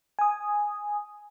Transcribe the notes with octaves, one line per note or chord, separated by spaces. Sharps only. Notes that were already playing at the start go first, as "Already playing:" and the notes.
G#5 D#6